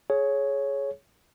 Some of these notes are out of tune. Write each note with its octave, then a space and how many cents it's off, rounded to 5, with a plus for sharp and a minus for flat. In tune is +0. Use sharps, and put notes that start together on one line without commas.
G#4 +20 C#5 +0